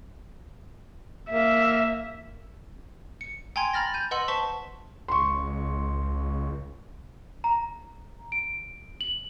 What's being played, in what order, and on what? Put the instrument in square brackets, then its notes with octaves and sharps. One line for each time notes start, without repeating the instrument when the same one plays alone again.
[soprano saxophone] A#3 [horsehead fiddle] E5
[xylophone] C#7
G5 G#5 A#5 C6 G#6
A#5 B5 F6 A6 A#6
G6 D#7
B4 D#5 F#5 C6 E6 F#7
C5 A5 C#6 B6 E7 G7
[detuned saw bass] C#2 [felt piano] C6 C#6
[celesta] A#5
D7
F#7